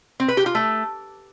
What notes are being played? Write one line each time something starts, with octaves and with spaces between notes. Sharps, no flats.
C4
B4
G4
F4
A3